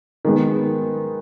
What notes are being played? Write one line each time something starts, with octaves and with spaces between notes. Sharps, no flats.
D#3 G#3 B3